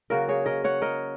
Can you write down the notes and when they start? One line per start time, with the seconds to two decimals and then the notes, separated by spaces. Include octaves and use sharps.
0.10 C#3 F#3 A#3 F#4 A#4
0.28 G#4 C#5
0.46 A#4 D#5
0.64 C#5 F#5
0.82 A#4 D#5